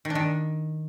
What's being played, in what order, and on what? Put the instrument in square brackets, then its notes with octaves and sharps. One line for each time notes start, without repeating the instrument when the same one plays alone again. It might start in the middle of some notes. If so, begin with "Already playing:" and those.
[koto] D#3
D4
D#3